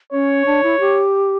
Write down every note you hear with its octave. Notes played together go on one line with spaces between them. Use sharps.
C#4 C#5
D4
E4
G4